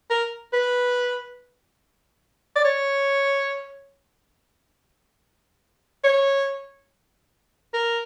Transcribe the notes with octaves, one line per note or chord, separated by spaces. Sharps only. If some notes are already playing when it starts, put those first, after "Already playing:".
A#4
B4
D5
C#5
C#5
A#4